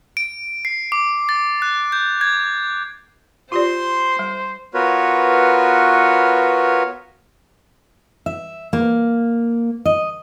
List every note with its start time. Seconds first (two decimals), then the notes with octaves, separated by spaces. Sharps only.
0.17 D7
0.65 C7
0.92 D6
1.29 A6
1.62 F#6
1.92 G6
2.21 G#6
3.52 F4 G4 C5 D5 C6
4.19 G3
4.74 B3 F4 F#4 A#4 B4 C#5
8.26 E5
8.73 A#3
9.85 D#5